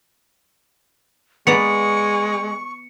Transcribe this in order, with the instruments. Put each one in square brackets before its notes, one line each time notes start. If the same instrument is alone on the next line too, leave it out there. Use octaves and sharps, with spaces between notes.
[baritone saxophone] G#3 [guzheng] B3 D5 A#5 [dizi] C#6 [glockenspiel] C#7